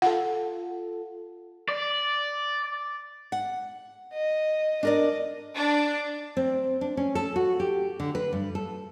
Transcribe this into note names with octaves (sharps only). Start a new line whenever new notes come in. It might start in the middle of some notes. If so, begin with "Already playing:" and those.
F4 A4 F#5
D5
F#5
D#5
D4 A#4 D5 D#5
D4
C4
D4
C#4
A4
F#4
G4
D3
B4
G2
A4